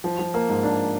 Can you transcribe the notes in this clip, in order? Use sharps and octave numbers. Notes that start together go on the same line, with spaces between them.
F3
F3
A#3
G#2
D4